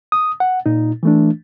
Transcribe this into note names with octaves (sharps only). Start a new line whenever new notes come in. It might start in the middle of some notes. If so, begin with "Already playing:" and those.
D#6
F#5
A#2 D#4
E3 A3 D4